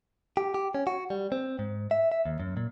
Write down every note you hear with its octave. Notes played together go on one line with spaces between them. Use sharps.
G4
G4
C#4
F#4
G3
C4
G#2
E5
E5
D#2
F#2
A#2